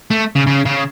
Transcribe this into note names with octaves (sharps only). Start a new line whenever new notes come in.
A3
C#3
C#3
C#3